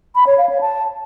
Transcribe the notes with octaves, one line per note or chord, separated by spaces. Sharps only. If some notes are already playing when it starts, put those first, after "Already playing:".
B5
C#5
F5
C#5
A5